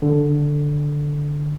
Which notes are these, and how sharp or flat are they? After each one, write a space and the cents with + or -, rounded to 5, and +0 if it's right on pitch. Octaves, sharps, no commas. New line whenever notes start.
D3 +0